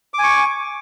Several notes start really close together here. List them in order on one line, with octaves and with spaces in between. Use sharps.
D6 G#5 C#6